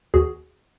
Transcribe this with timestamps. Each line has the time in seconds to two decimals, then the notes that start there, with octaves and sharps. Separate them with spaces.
0.14 D#2 F#4 G#4